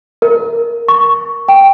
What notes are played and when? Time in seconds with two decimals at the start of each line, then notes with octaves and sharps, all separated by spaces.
0.22 A#4
0.88 C#6
1.48 G5